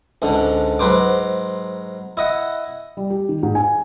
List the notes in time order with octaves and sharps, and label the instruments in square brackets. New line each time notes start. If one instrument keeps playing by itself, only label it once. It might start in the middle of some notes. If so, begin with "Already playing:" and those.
[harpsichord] C#2 G#2 D3
G#2 F#3 B4 C5 D6
E4 D#5 F#5
[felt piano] G3
G4
D#3
G#2
G#5